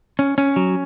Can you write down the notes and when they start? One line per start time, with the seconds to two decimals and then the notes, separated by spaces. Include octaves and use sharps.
0.19 C#4
0.38 C#4
0.56 F#3